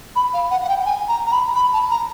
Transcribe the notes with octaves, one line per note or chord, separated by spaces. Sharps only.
B5
F5
F#5
F#5
G5
G#5
A#5
A#5
B5
B5
A5
A#5